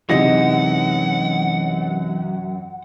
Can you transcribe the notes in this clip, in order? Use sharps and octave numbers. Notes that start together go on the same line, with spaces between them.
F#2 C3 E3 G#3 D#4 D#5 F#5 A#6